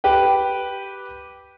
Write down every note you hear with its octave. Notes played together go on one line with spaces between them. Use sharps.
G4 B4 G5